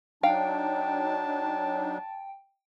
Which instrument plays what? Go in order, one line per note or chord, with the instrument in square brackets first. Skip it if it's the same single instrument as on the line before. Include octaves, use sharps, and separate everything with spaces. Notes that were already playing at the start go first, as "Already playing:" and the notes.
[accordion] F#3 D4 D#4 [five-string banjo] F5 [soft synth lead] G5 [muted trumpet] A5